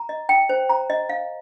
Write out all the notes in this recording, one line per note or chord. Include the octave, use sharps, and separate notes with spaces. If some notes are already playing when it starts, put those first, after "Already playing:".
Already playing: A#5
D#5
G5
C5
A#5
D#5
F5